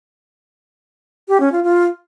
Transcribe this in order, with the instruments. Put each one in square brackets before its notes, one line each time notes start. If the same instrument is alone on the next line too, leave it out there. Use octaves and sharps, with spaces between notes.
[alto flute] G4
C#4
F4
F4